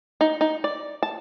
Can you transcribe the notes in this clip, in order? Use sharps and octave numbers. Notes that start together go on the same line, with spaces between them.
D#4
D#4
D5
A5